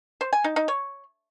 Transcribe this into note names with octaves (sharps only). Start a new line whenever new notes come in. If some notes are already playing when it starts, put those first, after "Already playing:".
C5
G#5
D#4
D#4
C#5